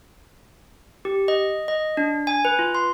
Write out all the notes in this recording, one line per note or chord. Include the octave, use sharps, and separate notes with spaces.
G4
D#5
D#5
D4
G#5
B4
F4
C6